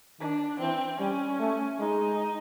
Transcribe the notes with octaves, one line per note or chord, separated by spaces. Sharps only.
D#3 D4
E3 C4
G3 C#4
A3
G#3 D#4